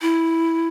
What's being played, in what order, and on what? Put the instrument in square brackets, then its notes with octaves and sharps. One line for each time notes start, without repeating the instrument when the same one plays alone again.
[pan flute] E4